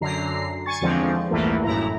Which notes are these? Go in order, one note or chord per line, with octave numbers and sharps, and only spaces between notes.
F#2 D3 A#5 C7
G#5 C#6 A6
E2 D3 F3 G#3 C4 D4
A#1 E2 G2 E3 A3 A#3
G1 F#2 A2 E4 A#5